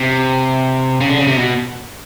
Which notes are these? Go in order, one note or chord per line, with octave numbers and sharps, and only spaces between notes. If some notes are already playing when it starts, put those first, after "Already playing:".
Already playing: C3
C#3
D3
C#3
C3
B2